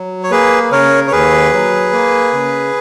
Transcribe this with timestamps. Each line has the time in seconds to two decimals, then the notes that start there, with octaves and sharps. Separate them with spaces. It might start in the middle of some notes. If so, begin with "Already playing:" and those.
Already playing: F#3
0.24 C#5
0.31 A#3 G#4 B4
0.72 C#3 A#4 C#5
1.07 C#5
1.12 D#2 G#4 B4
1.53 F#3
1.93 A#3
2.32 C#3